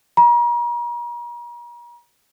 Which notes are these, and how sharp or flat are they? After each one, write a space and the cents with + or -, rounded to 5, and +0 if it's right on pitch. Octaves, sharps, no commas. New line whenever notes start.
A#5 +40